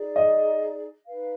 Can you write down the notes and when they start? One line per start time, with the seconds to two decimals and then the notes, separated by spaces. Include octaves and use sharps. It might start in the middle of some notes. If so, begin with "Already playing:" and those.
Already playing: D#4 G#4 D5
0.16 D#5
1.07 D#4 B4 F5